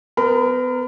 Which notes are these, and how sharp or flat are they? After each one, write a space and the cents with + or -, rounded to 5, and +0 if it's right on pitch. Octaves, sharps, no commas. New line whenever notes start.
B3 +30 A#4 +0 B5 +40